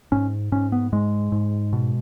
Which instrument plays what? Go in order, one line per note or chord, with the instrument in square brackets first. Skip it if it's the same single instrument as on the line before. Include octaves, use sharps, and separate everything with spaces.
[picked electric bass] G#2 C#4
G#2 C#4
B3
G#2 G#3
G#2
B2